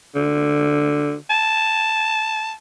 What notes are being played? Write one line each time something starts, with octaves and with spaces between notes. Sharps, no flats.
D3
A5